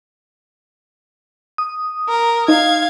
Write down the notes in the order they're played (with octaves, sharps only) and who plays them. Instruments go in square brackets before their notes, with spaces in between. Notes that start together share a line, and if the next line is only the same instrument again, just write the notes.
[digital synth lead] D#6
[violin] A#4
[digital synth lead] D#4 [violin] F5 G#6